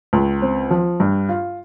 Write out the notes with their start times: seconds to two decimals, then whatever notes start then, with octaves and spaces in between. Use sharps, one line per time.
0.13 C#2
0.42 C4
0.71 F3
1.00 G2
1.29 F4